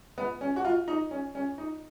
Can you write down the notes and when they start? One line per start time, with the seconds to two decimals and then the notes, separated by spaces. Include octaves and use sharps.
0.18 B3
0.41 C#4
0.56 F#4
0.65 F4
0.88 D#4
1.11 C#4
1.35 C#4
1.58 D#4